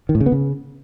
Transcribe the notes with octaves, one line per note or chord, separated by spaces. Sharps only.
D#3
A2
C#3
B3
C#3